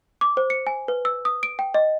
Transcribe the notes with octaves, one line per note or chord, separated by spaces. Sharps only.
D6
C5
C#7
G#5
B4
E6
D#6
D7
G5
D#5